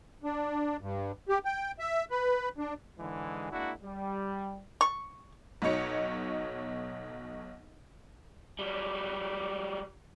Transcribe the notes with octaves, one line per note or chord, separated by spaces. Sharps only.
D4
G2
G4
G5
E5
B4
D4
G#2 D3 E3 G#3
G#3 A#3 D4 E4 F#4
G3
C#6
B1 B2 D#4 C#5 C#7
F#3 G3